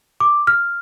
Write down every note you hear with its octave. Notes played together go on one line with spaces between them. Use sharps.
D6
F6